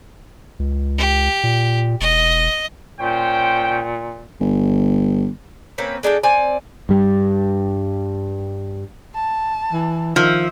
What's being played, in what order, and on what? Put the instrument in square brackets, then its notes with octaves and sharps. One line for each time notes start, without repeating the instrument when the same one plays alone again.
[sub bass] C#2
[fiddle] G4
[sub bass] A#2
[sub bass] E1 [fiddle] D#5
[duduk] A#2 [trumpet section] C#4 C5 G5
[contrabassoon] G1
[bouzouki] A#3 C4 C#4 B4
G#3 D4 A4 G5
C4 D5 G#5
[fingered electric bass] G2 G3
[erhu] A5
[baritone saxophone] E3
[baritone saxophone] D#3 [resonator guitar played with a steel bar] F3 [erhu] E5